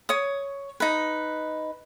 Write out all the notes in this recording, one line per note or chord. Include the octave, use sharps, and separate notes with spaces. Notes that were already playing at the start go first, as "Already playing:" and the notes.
C#5 D#6
D#4 B4